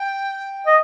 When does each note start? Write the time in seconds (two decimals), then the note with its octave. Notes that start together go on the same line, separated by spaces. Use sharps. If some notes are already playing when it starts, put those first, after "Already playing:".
Already playing: G5
0.67 D#5